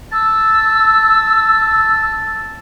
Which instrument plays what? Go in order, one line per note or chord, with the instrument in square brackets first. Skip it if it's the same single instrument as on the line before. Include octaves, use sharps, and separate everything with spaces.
[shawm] A5 [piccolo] E6